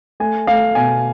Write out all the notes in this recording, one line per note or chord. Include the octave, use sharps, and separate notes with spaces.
A3 G#5
A3 F5
B2 G#5